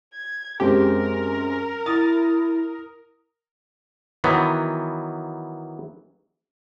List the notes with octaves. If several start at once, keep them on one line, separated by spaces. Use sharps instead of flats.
G#6
F#2 G#3 C4 G4 A#4
E4 D#6 A6
D#3 E3 F#3 B3